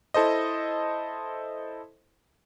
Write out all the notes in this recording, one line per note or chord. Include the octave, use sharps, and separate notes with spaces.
E4 A4 C5 D#5